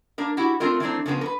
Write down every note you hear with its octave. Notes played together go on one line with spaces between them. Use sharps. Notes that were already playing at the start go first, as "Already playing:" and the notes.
A#3 D4 A#4
E4 F#4 G4
A3 C4 D4 F4 A#4
E3 A3 A#3 C4 D4
C#3 F3 A#3 B3
A#4 B4